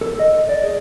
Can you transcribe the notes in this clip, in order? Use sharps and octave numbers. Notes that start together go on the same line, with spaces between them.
A4
D#5
D5
G#4